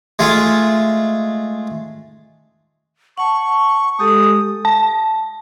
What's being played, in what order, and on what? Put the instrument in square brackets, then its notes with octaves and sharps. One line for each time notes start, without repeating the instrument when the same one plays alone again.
[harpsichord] G#3 A3 F4
[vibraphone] F#5 A5 [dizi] C#6
[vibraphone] G#3 G4 A4 [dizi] D#6
[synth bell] A5